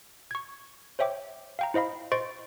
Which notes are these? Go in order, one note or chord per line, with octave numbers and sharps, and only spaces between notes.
C#6 G#6
C5 C#5 E5 G5 D6
F5 G5 A#5
E4 C5 D#5 F5 B5
C5 D#5 C6 C#6 A6 D7